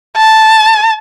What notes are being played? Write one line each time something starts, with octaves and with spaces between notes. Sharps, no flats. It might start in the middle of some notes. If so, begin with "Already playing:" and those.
A5